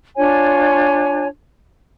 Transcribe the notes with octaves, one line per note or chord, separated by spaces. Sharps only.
D4 F4 C#5 G#5